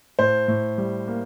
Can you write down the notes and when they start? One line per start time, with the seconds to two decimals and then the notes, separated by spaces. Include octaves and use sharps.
0.19 A2 C5
0.48 A2
0.78 G3
1.07 A#3